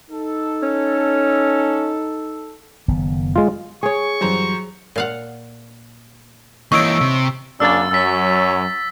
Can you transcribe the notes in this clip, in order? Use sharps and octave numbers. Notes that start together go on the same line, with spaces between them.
D#4 A4
C#4
F#1 D#3 B3
G#3 F4
G#4 C#5 C#6
F#2 E3 F#3 G3 C5 A#5
A#2 F5 F#5
E3 A#3 D#4 C#5 C#6 E6 D7
C3
F#2 C#3 A#3 D4 E6 A6
F#2 F#3 E6 B6